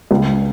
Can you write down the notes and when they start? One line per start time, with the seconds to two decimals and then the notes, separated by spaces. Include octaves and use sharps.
0.11 C#2